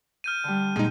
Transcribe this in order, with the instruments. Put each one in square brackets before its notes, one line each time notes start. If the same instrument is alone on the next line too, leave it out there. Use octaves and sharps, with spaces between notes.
[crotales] F6 G6 D#7
[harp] D3 G3
[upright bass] A#2 [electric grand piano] G#3 D#4